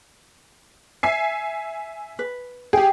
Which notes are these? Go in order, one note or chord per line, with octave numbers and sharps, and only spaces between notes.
E5 G#5 C7
B4
G4 G#4 G5